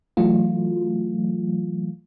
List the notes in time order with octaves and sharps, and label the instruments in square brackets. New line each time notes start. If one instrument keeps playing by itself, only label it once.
[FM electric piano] E3 F#3 A3 F4